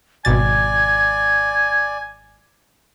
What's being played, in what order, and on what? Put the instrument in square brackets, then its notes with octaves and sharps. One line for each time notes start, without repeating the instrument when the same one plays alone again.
[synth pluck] G#1 B2 A6 [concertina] D5 [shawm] G#5 [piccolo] G#6